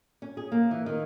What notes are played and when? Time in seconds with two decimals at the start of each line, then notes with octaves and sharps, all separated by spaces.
0.22 C#4
0.37 G#4
0.52 A#3
0.71 E3
0.86 D#3